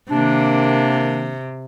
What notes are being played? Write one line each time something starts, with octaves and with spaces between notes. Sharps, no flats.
C3 D#3 A#3 D4